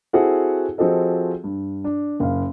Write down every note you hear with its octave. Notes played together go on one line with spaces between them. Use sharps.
C4 E4 F#4 G#4 A4 F#5
F3 C4 F#4 G#4 A4 D#5
G2
D4
F#1 F5